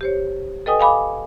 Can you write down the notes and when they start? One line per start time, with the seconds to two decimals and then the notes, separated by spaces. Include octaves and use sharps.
0.01 G4 C5 C#5
0.66 A4 B4 D#5 G5 G#5 D#6
0.79 F5 G#5 B5 D6